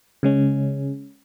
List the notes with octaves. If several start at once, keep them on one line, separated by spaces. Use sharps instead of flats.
C#3 G#3 C#4